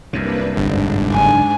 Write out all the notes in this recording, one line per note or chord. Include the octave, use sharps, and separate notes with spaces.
C2 F#2 C3 A#3 D4 B4
G1 G#2 D4
F#1 G#5